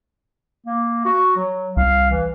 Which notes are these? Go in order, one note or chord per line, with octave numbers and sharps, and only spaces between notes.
A#3
F#4
F#3
C2 F5
E3